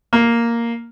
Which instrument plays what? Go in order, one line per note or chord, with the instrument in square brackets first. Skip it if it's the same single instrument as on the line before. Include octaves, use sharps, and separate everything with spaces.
[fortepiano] A#3